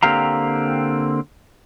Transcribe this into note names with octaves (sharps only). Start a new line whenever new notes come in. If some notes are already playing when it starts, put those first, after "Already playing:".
D3 A#3 C4 G4 F5 A#5